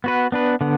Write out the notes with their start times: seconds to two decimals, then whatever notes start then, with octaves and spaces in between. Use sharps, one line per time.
0.04 B3 F#4 B4
0.32 B3 D4 B4
0.61 D3 B3